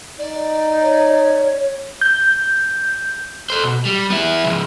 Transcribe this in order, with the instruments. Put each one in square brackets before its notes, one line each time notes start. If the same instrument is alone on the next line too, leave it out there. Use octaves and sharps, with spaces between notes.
[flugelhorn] D#4 [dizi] D5
[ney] C#5
[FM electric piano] G6
[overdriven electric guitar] A4 C5
B2
G3
B3 E4
C#3 F3